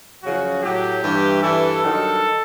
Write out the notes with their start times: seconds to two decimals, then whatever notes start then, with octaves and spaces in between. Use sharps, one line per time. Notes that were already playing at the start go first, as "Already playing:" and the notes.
0.22 F#2 C#3 F3 F#4
0.63 A2 F#3 G4
1.02 G2 E3
1.43 G2 E3 A4
1.83 G2 D#3 F#3